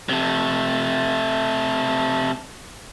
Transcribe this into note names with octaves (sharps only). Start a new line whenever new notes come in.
C3 A3